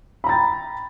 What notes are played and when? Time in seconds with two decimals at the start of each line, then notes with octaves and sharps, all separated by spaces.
0.24 B5
0.26 A#5
0.29 A6
0.32 G5